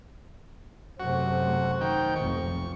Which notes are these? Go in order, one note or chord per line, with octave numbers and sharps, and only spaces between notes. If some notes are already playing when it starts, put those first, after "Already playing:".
F#2 C3 A3 F#4 C5
D#3 G5
F1 B1 F2 C#6